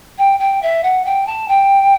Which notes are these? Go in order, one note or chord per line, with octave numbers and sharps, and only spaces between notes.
G5
G5
E5
F#5
G5
A5
G5